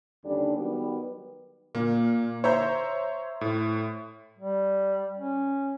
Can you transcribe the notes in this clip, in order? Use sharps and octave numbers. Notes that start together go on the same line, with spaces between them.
D#2 D3 G3 C#4 D4
D#3 F#3 G3 B3 G4
A#2 A#3
C5 C#5 E5 A#5 C#6 G6
A2
G3
C#4